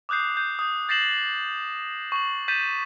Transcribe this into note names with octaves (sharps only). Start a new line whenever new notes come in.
D6 D#6 F#6 G6 C7
G6
D#6 G6
G6 A6 A#6 C7 E7 F#7
C#6 F#7
G6 A6 B6 D#7 E7